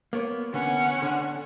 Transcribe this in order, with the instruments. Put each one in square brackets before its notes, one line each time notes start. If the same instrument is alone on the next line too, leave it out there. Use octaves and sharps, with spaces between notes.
[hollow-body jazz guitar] A#3 B3 C#5
[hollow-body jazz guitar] D3 B3 [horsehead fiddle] C#4 F#5
[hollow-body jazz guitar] D3 D4